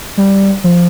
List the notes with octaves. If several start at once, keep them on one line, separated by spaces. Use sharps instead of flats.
G3
F3